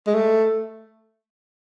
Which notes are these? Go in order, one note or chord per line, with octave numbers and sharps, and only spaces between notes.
G#3
A3